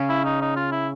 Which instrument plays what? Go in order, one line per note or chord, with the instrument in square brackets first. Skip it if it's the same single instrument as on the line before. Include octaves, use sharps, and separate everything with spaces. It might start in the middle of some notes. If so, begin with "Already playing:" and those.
Already playing: [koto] C#3 C#4
[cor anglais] E4
D#4
D#4
F4
E4